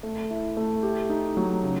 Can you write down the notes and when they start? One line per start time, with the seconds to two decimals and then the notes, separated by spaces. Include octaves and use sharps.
0.03 A3
0.31 E4
0.57 A3
0.83 G4
1.10 D#4
1.37 F#3
1.63 C#3